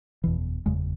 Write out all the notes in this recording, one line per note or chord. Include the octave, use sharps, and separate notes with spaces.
F#1 E2 B2 E3
F#1 E2 C#3 G#3